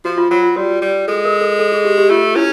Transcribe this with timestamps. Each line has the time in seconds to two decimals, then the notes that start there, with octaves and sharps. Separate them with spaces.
0.05 F3 F#4
0.18 F4
0.31 F#3 F4
0.43 F4
0.56 G3 F#4
0.82 G3
1.08 G#3 A4
1.25 A#4
1.41 A4
1.59 A4
1.72 G#4
1.85 G4
1.98 G4
2.10 A3 F4
2.36 C#4 E4